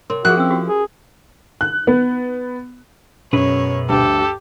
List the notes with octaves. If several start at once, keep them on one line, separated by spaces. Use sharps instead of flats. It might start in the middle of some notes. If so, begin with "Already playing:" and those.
C3 A#4 C#5 C6
F3 E4 F#4 G#4 A#4 F#6
C4 C#4 E6
F#4 G4
G#4
F#6
B3
F#2 B2 G#4 B4 C#5
D2 G2 G4 A4